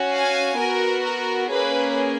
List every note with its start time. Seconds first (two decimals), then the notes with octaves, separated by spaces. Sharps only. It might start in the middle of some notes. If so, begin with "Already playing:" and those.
Already playing: C#4 F#4
0.11 F5 G#5
0.57 B3 F#4 A#4
1.04 A#4
1.51 A#3 C#4 G#4 B4